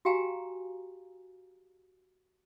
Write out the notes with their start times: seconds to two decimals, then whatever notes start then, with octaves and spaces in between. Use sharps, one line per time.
0.05 F#4 G4 F5 G5 G#5 A#5